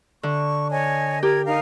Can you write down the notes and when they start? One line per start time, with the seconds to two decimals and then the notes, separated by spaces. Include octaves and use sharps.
0.23 D3 C#6
0.70 C#5 D#5 G#5
1.23 G4 A#4 G#6
1.46 D#4 A#4 F5